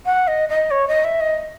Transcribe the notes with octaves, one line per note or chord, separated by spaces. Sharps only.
F#5
D#5
D#5
C#5
D#5
E5
D#5